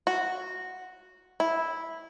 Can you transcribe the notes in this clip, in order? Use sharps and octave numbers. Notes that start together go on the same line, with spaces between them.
F#4
E4